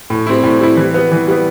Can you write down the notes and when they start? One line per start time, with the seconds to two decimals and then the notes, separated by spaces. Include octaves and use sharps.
0.10 A2
0.27 G3 C4 E4
0.43 A2
0.60 G3 C4 E4
0.77 E3
0.94 G3 B3
1.12 E3
1.28 G3 B3